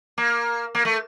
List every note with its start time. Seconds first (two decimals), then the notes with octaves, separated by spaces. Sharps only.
0.18 A#3
0.75 A#3
0.85 A3